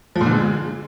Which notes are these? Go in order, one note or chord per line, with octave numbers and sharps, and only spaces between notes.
F3
A#2
D3
G#3